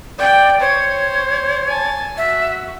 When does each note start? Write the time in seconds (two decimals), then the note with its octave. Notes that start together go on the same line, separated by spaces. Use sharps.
0.18 D5 G5
0.60 C5 C#5
1.69 G#5 A5
2.17 F#4 E5